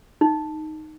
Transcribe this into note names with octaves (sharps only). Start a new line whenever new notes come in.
D#4